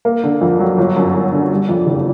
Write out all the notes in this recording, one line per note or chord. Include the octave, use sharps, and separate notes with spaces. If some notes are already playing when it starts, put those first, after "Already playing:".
A#3
D3
F2
F#3
G1
F#2
G1
D3
G3
F2
F#1